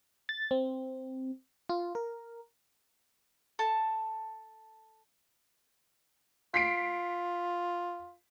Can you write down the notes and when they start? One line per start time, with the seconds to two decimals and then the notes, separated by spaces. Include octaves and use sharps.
0.29 A6
0.51 C4
1.69 F4
1.95 A#4
3.59 A4 A5
6.54 F4 B6 C7 D7